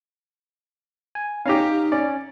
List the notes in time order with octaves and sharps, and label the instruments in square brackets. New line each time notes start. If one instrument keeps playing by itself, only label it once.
[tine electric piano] G#5
[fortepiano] C#4 G4 [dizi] D#4 [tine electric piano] F5 A#5
[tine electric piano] C#4 [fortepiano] D5